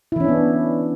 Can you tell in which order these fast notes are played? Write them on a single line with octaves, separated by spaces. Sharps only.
E4 E3 C#4 D4 B3